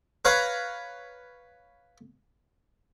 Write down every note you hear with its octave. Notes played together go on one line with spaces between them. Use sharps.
B4 C#5 F5 A#5